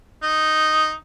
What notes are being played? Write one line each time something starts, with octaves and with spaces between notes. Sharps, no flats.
D#4